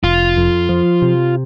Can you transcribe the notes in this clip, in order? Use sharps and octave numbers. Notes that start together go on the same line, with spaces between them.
F1 F4
F2
F3
C3